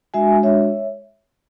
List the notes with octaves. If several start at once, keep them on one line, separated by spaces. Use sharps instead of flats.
G#3 D4 F#4 E5 G#5
G#3 D4 F#4 C#5 E5